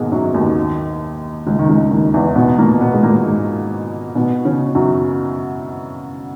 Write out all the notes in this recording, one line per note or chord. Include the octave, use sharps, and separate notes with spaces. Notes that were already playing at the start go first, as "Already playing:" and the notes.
Already playing: G#2 B2 G#3 A#3 B3
F#2 F#3
D#2 D#3
C#2 C#3
D#3
C#2 C#3
D#2 D#3
E2 E3
B2 B3
A#2 A#3
B2 B3
G#3
A#2 A#3
G#2 G#3
B2 B3
C#3 C#4
F#2 F#3